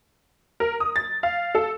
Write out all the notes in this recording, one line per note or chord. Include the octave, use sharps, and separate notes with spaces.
A#4
D#6
A6
F5
A4